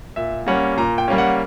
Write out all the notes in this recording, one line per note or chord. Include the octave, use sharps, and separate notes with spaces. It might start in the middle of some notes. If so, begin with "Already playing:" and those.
A#2 E5
G3 A#3 C#4 F#5
A#2 A#5
G5
G3 A#3 C#4
F#5